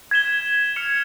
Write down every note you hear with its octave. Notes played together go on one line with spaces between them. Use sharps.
G#6 B6 E7 G7
F6 G#6 C#7 F7